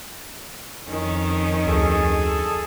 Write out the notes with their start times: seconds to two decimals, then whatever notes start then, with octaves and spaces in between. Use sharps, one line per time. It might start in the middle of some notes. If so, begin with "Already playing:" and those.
0.88 F2 D#3 C#4
1.67 D2 G#4 A4